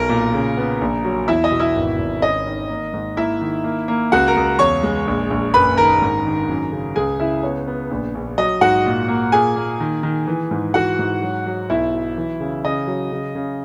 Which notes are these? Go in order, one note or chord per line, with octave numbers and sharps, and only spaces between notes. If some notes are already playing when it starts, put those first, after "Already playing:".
Already playing: B1 A#4 A#5
A#2
C#3
B3
A#1
F#3
E2 E4 E5
D#5
B2
E4 E5
G#1
G#1
C#4 D#5
D#3
A#3
G#2
A#3 E4 E5
D#3
A#3
A#3
C#2 F#4 F#5
A#4 A#5
C#2
E2 C#5 C#6
G#3
A#1
A#1
F#1 B4 B5
D#3 A#4 A#5
G#2
D#3
F#2
C#3
C#2 G#4 G#5
C#3 E4 E5
B3 C#5
B3
A#1
A#1
F#3 D#5
G#2 F#4 F#5
A#2
A#3
A#2 G#4 G#5
A#3
D#3
D#3
E3
G#2
E3 F#4 F#5
G#2
F#3
F#3
B1 E4 E5
F#3
E3
C#3
C#3 D#5
F#3
C#3
C#3